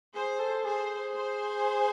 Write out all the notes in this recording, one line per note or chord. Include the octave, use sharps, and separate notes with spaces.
G#4 C5
A4
G#4 C5
C5